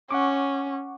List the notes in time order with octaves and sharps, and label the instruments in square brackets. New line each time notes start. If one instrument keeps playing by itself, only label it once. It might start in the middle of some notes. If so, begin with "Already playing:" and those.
[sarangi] C#4 [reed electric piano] F#5 C#6 D6